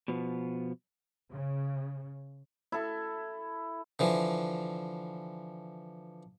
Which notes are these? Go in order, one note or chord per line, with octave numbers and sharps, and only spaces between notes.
B2 F3 B3
C#3
E4 A4
D3 E3 F3